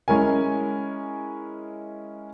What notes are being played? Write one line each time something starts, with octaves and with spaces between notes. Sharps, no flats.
G#3 C#4 E4 A#4 G#5